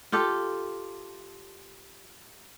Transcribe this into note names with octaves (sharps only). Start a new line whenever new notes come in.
F4 G4 A4